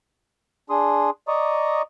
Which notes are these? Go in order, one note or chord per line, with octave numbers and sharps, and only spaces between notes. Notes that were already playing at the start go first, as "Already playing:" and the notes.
D4 G#4 C6 D#6
D5 D#5 A#5 C#6 D#6